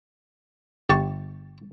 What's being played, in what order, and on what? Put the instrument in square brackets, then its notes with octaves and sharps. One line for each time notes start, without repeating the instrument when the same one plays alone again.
[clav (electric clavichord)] G1 [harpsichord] G4 A5 C#6